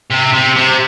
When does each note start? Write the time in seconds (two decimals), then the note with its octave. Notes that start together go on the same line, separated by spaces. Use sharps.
0.11 C3
0.34 C3
0.56 C3